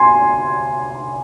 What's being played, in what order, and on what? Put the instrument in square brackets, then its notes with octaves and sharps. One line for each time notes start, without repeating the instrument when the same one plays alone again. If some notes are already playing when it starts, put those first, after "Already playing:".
Already playing: [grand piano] G#5 C6